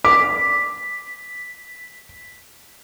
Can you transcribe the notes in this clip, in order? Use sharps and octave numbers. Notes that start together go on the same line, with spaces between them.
D6 B6